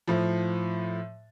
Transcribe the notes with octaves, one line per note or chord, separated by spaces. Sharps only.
A2 F3